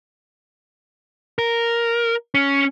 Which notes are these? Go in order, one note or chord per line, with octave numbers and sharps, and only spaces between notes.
A#4
C#4